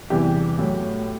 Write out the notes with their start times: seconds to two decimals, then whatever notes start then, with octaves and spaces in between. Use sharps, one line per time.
0.10 E2 C3 E3 G3 G4
0.59 A2 F#3